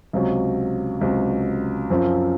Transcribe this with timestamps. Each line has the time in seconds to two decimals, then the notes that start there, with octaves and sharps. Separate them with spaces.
0.13 C#2 C3 F#3
1.01 C#2 C3 F#3
1.90 F#2 F3 C4 F4